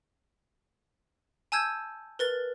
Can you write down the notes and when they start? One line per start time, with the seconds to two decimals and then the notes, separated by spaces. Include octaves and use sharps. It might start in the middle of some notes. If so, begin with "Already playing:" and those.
1.52 G#5 A5 E6 G6 G#6
2.19 A#4 B4 A6 G7